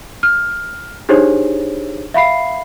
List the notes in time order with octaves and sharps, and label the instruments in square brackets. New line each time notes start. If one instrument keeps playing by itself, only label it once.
[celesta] F6
D4 D#4 G4 G#4 C5 C#5
E5 F5 B5 C7